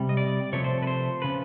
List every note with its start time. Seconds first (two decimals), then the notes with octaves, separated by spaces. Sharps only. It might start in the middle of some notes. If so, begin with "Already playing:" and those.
Already playing: C3 G3
0.09 D#5
0.17 D5
0.52 C3 F3 A3 C4 C#5
0.64 C5
0.83 B4
0.87 C5
1.22 C#3 F3 B4